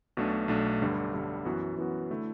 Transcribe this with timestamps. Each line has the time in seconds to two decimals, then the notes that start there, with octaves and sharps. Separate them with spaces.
0.17 B1 B2 A3 D4
0.48 B1 B2 A3 D4
0.81 G1 G2 D3 G3
1.13 G1 G2 D3 G3
1.45 F#2 E3 B3 F#4
1.77 F#2 E3 B3 F#4
2.10 D3 A3 E4